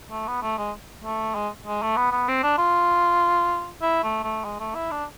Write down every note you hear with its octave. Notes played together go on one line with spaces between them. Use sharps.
A3
B3
A3
G#3
A3
G#3
G#3
A3
B3
B3
C4
D4
F4
E4
A3
A3
G#3
A3
E4
D4